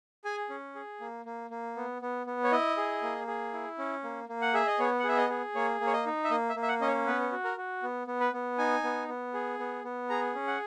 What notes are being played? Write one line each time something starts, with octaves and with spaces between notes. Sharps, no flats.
G#4 G#5
C#4
G#4
A#3
A#3
A#3
B3
B3
B3
C#5
E4 D#5
G#4
A#3
G#4
E4
C#4
A#3
A#3
F#5
G#4 E5
D#5
B3 C#5
F#5
G#4 E5
D#5
G#4
A#3 C#5
A#3
C#5
D#5
D#4
E5
A#3 D#5
E5
A#3
E5
F#5
C#4 D#5
C#5
B3 B4
F#4
A#4
F#4
B3
B3
B4
B3
D#4 G#5
B3
B3
G#4
B3
B3
G#4 A#5
C#4
F#5